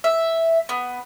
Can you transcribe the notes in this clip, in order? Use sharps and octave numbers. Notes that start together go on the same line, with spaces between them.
E5
B3